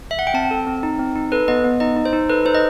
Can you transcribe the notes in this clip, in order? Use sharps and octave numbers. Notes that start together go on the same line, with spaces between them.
E5
F#5
G5
C4 A5
A4
C4
D#4
C4
D#4
A4 B4
B3 D#5
B3
D#4 D#5
D#4
C5
D#4
A4 B4
D#4 C5
D#5